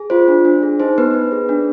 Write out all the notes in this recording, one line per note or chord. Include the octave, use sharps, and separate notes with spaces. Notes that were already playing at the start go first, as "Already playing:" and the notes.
Already playing: G#4
F4 C5
D4
D4
G#4
D#4 C5
B3 B4
B3
G#4
D4